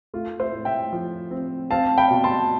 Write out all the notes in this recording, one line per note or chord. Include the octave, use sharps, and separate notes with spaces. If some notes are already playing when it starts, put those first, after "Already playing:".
A3 F4
C5 E5
A2
E5 G5
F3
C4
C4 F5 A5
G5 B5
B2
A5 C6